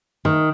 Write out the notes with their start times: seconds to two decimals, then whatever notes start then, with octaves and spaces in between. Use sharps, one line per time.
0.25 D#3